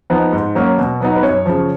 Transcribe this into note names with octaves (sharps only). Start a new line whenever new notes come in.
F3 B3 D#4
G#2
F#3 A#3 C#4
B2
F#3 B3 D#4
B4
F#2 C#5
C#3 F3